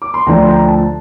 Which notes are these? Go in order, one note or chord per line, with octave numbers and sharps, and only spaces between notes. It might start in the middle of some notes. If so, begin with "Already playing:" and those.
D6
C6
D2 D3 F3 A3 G5 A#5
C6
G5 A#5
A5